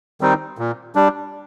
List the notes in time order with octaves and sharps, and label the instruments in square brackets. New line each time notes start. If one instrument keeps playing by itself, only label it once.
[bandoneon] D#3 G3 C4 D#4
A#2
G3 D4